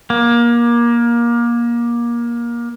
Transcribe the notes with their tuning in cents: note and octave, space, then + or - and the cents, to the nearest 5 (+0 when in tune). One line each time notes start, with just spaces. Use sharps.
A#3 +25